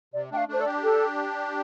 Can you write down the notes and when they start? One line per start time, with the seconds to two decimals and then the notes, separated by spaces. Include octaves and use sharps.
0.13 C3 D5
0.31 A3 D4 G5
0.37 F5
0.48 A3 D4 C5
0.60 A4 D5
0.66 D4 G4
0.84 A4